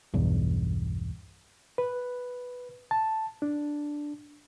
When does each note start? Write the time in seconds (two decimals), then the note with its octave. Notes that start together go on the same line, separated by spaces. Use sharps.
0.14 B1 E2 G2
1.78 B4
2.91 A5
3.42 D4